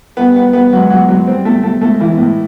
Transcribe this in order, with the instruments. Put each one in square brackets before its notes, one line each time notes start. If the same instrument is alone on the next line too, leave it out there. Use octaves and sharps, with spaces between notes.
[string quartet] G3 [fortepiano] B3
[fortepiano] B3
B3
[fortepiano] F#3 [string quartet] G#3
[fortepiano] F#3
F#3
[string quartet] G3 [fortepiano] C4
[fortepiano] A3
A3
[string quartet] G#3 [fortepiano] A3
[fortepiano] E3
A2